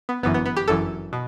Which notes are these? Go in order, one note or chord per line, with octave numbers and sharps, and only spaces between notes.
B3
G1 F#2 E3 B3
B3
B3
G4
G1 F#2 E3 A4
B2